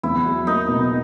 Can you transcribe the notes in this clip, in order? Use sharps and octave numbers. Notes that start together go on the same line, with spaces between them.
E2 E4
F#3
A#3 D#4
B2